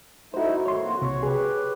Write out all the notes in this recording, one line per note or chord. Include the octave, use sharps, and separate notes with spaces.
A3 D#4 E4 F#4 C5
G#2 D#3 C#5 C6
F2 A#3 F#4
C2 C3 F#4 C#5
G4 G#4 B4 C#5